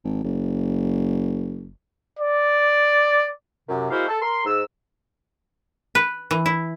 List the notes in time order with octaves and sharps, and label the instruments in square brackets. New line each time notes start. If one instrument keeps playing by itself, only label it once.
[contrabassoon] G#1
F#1
[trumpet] D5
[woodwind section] F#2 C3
G#3 A#3 E4 F#4 C5 F5
A4
A#4 C6
G#2 E6
[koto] B4
E3
E4